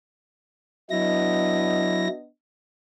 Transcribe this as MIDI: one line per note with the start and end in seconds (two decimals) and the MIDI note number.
0.91 2.08 54
0.91 2.26 59
0.91 2.26 62
0.91 2.08 64
0.91 2.26 75
0.91 2.08 94